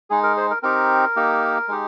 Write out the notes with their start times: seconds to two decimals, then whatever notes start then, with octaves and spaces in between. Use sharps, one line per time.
0.10 G#3 D#4 G#4
0.23 A#4
0.37 G#4 C5
0.51 A#4
0.63 C4 D#4 G4 A#4
1.16 A#3 D#4 G4
1.68 G#3 D#4 G4